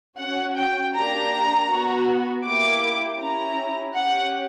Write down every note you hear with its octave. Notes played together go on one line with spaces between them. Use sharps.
C#4 F#4 F#5
G5
A#3 D4 G4 A#5
B3 F#4
A#3 E4 G4 D6
C#4 E4 G4 A#5
C#4 G4 F#5